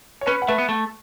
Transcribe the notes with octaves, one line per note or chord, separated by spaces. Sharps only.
C#5
C#4 B4
F#5
A3 B4 E5
B3
A3